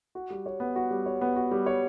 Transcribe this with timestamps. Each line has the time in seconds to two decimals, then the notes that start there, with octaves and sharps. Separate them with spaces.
0.15 F#4
0.30 G3
0.46 C#5
0.60 B3
0.76 F#4
0.91 G3
1.06 C#5
1.21 B3
1.36 F#4
1.51 G3
1.66 C#5